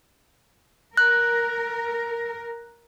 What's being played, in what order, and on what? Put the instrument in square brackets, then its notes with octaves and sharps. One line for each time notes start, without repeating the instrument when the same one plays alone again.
[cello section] A#4 [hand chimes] F#6